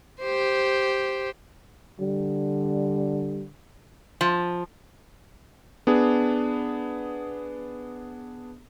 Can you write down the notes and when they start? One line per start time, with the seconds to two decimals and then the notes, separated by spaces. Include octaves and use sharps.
0.21 G4 C5
2.00 D3 G3
4.21 F3
5.87 B3 D4 G#4